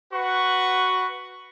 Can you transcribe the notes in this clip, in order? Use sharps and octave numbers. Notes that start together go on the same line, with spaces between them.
F#4 B4 F#5 C#6